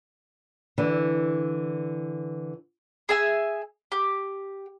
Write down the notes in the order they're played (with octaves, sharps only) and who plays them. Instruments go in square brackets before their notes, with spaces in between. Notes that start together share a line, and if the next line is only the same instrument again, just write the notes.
[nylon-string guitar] D3 E3
[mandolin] G#4 E5 G#5
G4